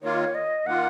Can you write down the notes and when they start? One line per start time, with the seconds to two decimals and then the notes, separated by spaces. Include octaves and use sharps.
0.02 D#3 A#3 F4 C#5
0.35 D#5
0.66 D#3 A#3 F4 F#5